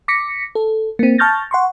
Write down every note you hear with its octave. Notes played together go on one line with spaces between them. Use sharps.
D6 A#6 B6 C#7
A4
A#3 C4
A5 C#6 F6 G6 A6 A#6
F#5 C6 C#6